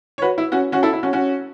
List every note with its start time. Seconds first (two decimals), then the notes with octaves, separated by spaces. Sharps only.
0.18 C#5
0.22 F#4 B4
0.38 E4
0.52 C#4 F#4
0.72 C#4 F#4
0.82 E4 A4
0.93 E4
1.03 C#4 F#4
1.13 C#4 F#4